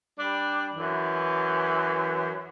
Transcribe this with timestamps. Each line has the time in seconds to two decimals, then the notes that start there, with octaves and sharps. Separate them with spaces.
0.19 G3 D4
0.74 F#2 E3